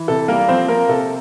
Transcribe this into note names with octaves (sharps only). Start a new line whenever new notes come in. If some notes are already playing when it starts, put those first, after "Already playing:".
Already playing: E3
C3 A4
G3 A#3 A#4
F3 C4 C5
A#3 C4 A#4
C3 A4